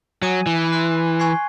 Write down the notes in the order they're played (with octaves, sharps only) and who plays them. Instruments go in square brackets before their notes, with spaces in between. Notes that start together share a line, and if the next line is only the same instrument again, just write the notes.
[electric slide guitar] F#3 [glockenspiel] G#5 D#6 G#6 D#7
[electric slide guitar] E3
[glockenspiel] C6 F#6 C7
G#5 C#6 G#6 C7